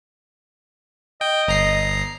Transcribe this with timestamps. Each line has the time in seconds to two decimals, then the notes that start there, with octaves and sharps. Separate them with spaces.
1.21 D#5 G5
1.48 G1 A#5 C7